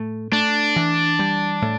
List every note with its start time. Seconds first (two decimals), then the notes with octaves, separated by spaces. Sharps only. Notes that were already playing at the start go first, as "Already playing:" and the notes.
Already playing: A2 A3
0.32 A3 D4
0.76 E3
1.19 G3
1.62 A2